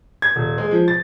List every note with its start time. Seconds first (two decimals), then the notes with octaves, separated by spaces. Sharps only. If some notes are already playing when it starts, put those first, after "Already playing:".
0.22 G#6
0.36 D#1
0.58 G#3
0.71 F3
0.88 A6